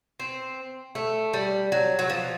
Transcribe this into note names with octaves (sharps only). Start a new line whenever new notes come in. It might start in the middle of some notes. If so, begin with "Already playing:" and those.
C4
A3
G3
F#3
F#3
F3